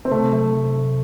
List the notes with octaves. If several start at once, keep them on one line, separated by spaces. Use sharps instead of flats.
C4
C3 A3
F#3 A3
C3
C3